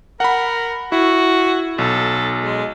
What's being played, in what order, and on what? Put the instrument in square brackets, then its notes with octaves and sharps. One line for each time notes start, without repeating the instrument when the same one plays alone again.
[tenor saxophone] A#4 [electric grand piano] F#5 B5
[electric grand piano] E4 [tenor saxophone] F#4
[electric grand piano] B1 [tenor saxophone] A4
[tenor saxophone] G#3